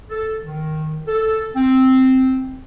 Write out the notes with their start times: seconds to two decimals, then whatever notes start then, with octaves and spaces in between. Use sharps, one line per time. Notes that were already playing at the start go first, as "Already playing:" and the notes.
0.10 A4
0.45 D#3
1.08 A4
1.56 C4